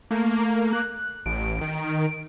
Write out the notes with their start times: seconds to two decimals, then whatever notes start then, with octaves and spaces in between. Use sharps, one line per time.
0.11 A3 A#3
0.73 F#6
1.26 A1 D7
1.61 D#3